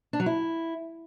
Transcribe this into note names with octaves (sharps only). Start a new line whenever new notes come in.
D4
F#3
E4